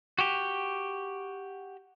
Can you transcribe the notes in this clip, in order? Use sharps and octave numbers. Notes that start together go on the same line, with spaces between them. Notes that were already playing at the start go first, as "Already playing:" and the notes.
F#4 G4